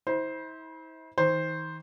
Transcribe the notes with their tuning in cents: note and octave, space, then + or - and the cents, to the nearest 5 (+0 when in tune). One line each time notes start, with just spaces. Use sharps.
E4 -40 C5 +0
D#3 +40 C5 +0